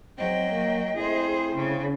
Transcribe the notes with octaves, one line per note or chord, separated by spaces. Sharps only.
G#2 F#3 C4 D#5 G5
A#3
A3 C4 E4 G#4 C5
C#3